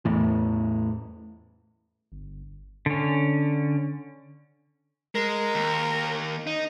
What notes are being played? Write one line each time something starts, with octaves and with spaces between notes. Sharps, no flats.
E2 A2 E3
G1
D3 C#4
G#3 A#4
D#2
D#4